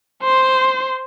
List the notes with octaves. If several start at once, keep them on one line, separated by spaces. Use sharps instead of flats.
C5 C6